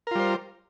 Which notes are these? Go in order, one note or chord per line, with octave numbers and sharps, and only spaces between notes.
G3 F4 A#4 C5